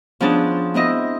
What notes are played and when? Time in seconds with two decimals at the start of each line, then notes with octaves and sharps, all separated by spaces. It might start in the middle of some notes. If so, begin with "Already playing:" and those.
0.20 F3 B3 C#4 D4 G#4 A5
0.74 B3 C4 E4 D#5